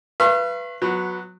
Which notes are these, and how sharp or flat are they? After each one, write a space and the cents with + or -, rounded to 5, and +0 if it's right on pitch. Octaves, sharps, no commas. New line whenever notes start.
B4 +0 F5 -45 C#6 -35
F#3 -15 B3 +0